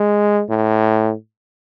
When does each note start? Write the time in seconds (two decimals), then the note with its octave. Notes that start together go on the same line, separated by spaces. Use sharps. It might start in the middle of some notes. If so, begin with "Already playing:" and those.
Already playing: G#3
0.50 A2